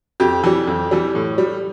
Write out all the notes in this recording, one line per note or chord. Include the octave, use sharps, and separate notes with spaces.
F2 G4
E3 G3
F2
E3 G3
A2
G3